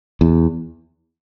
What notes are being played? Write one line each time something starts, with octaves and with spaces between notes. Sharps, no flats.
E2